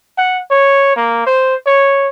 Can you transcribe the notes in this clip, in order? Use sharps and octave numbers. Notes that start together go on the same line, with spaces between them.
F#5
C#5
A#3
C5
C#5